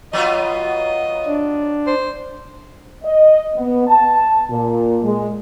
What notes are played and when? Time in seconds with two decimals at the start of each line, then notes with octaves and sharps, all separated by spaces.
0.13 F#3 B3 F4 D#5
1.26 D4
1.87 C5
3.04 D#5
3.56 B3
3.87 A5
4.50 A#2
5.03 G#3